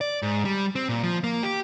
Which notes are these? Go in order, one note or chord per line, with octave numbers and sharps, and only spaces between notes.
D5
G#2
G3
C4
A#2
F3
A#3
G4